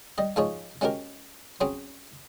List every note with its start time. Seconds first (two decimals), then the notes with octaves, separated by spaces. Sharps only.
0.18 G3 D#5
0.36 G#2 F3 G#3 G#4 C#5
0.81 G#3 C#4 F#4 G4 A#4
1.61 F#3 C4 C#4 G#4